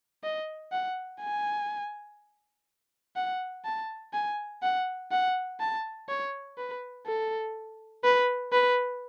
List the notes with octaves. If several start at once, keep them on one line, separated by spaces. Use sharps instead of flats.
D#5
F#5
G#5
F#5
A5
G#5
F#5
F#5
A5
C#5
B4
A4
B4
B4